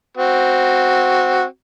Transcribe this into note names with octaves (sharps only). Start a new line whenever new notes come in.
C4 F#4